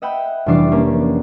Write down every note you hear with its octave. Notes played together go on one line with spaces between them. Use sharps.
D#5 E5 F#5 G5 B5
F1 E3 G3 D4 D6 C7
A#3 C#4 D4